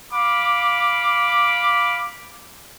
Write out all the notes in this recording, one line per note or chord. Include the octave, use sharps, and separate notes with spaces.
F5 B5 D6